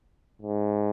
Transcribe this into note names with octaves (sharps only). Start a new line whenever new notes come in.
G#2